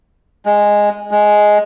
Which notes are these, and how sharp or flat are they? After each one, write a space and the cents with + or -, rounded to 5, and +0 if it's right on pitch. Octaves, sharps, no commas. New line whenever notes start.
G#3 -5
G#3 +5